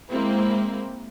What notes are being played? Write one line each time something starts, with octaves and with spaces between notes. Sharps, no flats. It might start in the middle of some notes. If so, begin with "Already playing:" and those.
G#3 A#3 C4 E4